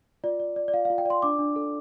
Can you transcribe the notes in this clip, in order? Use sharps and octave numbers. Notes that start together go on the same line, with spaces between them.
F4 D5
D5
D5
D5
F4 F5
F4 F5
G5
D5 C6
D4 D6
D4
A4